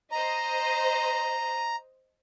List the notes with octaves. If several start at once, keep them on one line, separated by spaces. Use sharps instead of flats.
C5 D#5 A#5